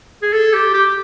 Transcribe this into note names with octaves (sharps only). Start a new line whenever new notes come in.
G#4
A4
G4
G4